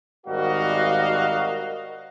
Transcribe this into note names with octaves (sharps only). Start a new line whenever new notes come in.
G#1 G3 F#4 A#4 D#5 F5